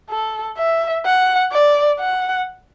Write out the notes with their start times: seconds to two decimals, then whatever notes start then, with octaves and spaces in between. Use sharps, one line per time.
0.10 A4
0.58 E5
1.06 F#5
1.52 D5
2.00 F#5